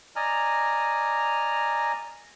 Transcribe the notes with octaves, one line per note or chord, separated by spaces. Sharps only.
D5 D#5 G#5 A#5 F6